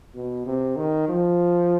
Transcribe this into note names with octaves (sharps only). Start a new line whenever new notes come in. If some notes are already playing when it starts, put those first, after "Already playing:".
B2
C3
D#3
F3